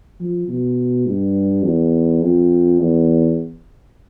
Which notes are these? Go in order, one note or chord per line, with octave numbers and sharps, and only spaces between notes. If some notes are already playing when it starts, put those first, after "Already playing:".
F3
B2
G2
E2
F2
E2